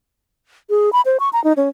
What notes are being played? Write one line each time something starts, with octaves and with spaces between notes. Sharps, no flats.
G#4
B5
C5
C#6
A#5
D#4
C#4